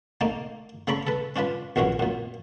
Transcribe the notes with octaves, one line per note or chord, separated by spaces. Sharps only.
A3 A#3 D#4 D5
C#3 A4 D5 A#5 B5 C#6
A4 B4
C#4 D4 F4 B4
A#1 F#2 E3 C#4 F#4
F#2 A#2